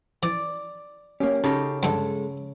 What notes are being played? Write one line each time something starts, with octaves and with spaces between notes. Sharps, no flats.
E3 D5
A#3 C#4 G4
C#3 D#4 G4 A4
G2 D3 G#3 A4